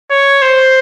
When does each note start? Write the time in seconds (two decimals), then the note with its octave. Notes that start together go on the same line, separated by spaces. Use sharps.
0.11 C#5
0.42 C5